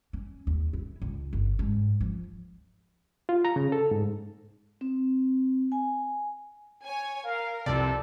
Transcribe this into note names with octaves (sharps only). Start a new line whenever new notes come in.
C#4
D#2
E4
C#2
G1
G#2
F3
F4
A#5
C#3
A4
G#2
C4
G#5
C#5 G#5
A#4 F5
C2 F2 C3 A4 D5